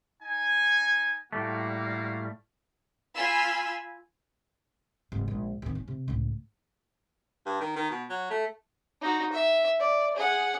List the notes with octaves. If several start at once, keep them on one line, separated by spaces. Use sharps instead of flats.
D#4 G#5
A2 G3 A3 A#3 F#4 F5
F4 G#5 B5 E6
F1 G#2
A#1 G#3
D1 D#3
C#4
C3
C#2 A2
G2
D#3
D#3
B2
F#3
A3
D#4 F#4
E5
D5
G#4 F#5